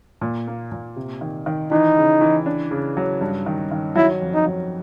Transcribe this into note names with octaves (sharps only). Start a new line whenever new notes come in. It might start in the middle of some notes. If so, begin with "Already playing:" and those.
A#2
A#3
A#2
C3
D#3
D#3
E3 D#4
C#3
E3
D4
C#3
F#3
G2
D#3
D#3
F#3 E4
F2
D#4
F#3